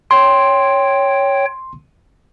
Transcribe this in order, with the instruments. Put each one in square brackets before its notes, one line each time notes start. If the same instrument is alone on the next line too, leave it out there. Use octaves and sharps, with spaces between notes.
[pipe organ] C#5 G5 [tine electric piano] C6